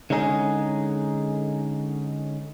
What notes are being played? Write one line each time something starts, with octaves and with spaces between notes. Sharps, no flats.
D3 G#3 C#4 D#4 G#4